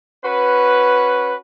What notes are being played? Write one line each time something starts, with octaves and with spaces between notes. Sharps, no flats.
C#4 F#4 B4